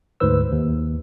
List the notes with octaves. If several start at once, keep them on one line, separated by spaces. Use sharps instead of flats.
D2 G#2 B4 C5 E6
D#2